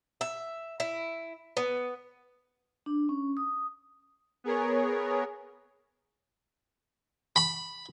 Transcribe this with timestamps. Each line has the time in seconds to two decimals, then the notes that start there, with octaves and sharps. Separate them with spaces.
0.21 E5
0.80 E4
1.57 B3
2.86 D4
3.09 C#4
3.37 D#6
4.44 B3 G#4 A#4 C#5
7.36 B5